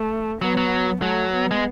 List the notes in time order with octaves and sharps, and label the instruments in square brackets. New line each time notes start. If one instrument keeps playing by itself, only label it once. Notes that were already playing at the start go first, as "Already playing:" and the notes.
Already playing: [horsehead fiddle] A3
[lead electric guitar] F#3 [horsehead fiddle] B3
[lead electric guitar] F#3
[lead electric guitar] F#3 [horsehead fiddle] A3
[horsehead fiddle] B3
[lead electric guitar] G#3